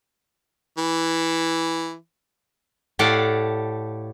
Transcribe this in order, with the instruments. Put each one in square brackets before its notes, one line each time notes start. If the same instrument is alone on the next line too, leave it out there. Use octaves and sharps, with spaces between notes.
[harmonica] E3
[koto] A2 G4 A4 D5 F5 F#5